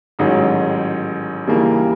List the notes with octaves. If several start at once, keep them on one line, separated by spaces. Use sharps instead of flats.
A1 G#2 D#3 F#3
D#2 C#3 E3 G3 A#3